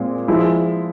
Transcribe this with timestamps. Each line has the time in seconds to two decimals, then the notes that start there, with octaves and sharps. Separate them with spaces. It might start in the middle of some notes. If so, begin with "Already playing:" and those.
Already playing: A#2 G#3 C4
0.28 F3 G#3 E4